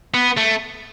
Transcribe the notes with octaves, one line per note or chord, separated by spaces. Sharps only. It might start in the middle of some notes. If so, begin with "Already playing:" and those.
B3
A3